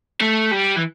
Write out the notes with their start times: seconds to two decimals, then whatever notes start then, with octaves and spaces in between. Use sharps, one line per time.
0.21 A3
0.51 G3
0.76 E3